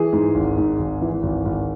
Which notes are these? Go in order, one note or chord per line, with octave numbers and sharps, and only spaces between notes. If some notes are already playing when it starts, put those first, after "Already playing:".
Already playing: E3 G#4
G#2
G#1
G#2
G#1
E3
G#1
G#1